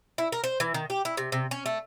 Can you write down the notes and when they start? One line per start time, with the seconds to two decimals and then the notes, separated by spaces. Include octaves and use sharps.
0.18 E4
0.32 A#4
0.44 C5
0.60 E3
0.74 D#3
0.90 G4
1.05 E4
1.17 C3
1.32 C3
1.51 C#4
1.66 A3